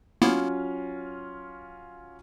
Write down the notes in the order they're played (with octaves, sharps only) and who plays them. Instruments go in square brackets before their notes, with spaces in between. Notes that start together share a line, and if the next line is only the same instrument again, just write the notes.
[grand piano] F#3 C#4 F4 [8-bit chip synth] A#3 B3 E4